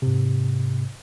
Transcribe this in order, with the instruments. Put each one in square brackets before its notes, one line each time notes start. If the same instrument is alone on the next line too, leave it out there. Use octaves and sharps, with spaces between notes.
[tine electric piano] G#2 C3